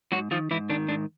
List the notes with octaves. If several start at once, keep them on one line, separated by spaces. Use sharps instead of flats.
G#2 F#3 F#4
D#3 F3 F4
G#2 E3 E4
D#3 D4
G#2 D4